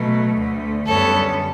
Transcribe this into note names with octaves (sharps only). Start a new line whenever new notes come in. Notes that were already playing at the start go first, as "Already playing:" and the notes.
Already playing: B2 F#3 A3
D2 D3 A3
F#2 D3 G3 B3 A4 C#5